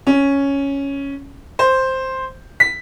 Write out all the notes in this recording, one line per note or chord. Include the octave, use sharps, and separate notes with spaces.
C#4
C5
B6